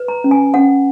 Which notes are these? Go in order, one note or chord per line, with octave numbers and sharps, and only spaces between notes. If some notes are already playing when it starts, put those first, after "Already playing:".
Already playing: B4
A#5
C#4
G#5
C#4 F#5